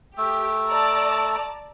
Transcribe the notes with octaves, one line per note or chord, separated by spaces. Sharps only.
A3 G4
D5 A5 A#5